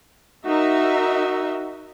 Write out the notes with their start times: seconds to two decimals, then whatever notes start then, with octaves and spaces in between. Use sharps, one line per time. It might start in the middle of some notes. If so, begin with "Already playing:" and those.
0.46 D#4 F#4 A#4 E5